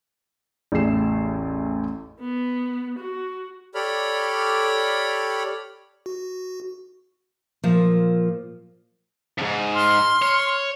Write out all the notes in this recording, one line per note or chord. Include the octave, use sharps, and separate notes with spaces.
A1 E2 A3 G#4 C7 E7
B3
F#4
G4 A4 C#5 D5 B5 F6
F#4
A#2 F3
F2 G#2
C6 F6
C#5